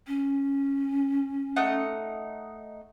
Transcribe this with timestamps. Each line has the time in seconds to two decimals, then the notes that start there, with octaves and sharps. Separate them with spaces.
0.07 C#4
1.56 A3 D#4 F#5